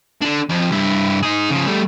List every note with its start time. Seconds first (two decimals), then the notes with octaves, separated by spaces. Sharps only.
0.22 D3 D4
0.49 F2 F3
0.72 G2 E4
1.23 D#4 G#4
1.50 C#3 F3
1.66 G3 A3